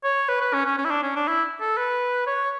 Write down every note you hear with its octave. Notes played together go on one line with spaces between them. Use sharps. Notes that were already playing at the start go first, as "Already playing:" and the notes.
C#5
B4
B4
C#4
C#4
C#4
E4
D4
C#4
D4
E4
A4
B4
C#5